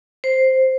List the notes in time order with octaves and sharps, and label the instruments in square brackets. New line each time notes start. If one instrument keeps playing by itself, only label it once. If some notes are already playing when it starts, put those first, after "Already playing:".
[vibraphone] C5